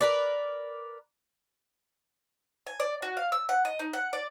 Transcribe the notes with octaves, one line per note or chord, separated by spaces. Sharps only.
A#4 B4 D5
G#5
D5
F#4
F5
E6
F#5
D#5
D#4
F#5
D5